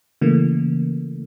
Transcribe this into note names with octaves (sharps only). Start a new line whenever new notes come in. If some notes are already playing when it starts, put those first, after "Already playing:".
C#3 E3 A3 A#3